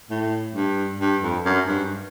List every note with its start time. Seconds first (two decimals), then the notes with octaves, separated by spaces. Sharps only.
0.10 A2
0.55 G2
1.00 G2
1.23 F2
1.45 F#2
1.67 G2